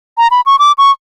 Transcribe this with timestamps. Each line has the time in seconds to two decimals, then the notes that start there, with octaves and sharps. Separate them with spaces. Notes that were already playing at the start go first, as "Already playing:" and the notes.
0.18 A#5
0.31 B5
0.46 C#6
0.59 D6
0.78 C#6